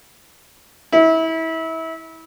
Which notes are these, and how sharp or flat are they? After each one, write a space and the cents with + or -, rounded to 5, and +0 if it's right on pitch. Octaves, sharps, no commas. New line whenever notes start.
E4 -25